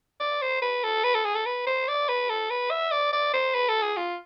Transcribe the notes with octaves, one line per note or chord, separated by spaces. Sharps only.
D5
C5
B4
A4
B4
A4
G#4
A4
B4
C5
D5
B4
A4
B4
E5
D5
D5
C5
B4
A4
G#4
F4